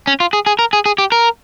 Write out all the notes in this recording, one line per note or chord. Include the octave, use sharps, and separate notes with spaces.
C#4
F4
G#4
G#4
A#4
G#4
G#4
G4
A#4